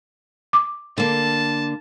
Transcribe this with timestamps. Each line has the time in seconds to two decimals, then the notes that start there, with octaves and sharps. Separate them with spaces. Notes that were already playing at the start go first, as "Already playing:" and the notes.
0.53 D6
0.98 D3 A#3 A5